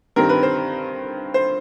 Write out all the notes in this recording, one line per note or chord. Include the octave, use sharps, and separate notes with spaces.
G2 D#3 G3 C4 A#4
B4
C5
C5